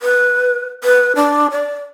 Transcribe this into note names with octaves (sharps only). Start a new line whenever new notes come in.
B4
B4
D4
D5